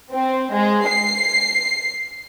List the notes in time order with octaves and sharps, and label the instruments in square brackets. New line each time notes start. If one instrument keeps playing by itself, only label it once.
[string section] C4
G#3
C7